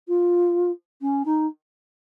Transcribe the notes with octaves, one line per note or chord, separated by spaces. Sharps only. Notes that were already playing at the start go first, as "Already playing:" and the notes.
F4
C#4
D#4